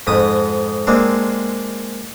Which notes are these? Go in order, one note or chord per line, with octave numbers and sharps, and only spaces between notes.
F2 G#2 D#6
G#3 A#3 C4 D4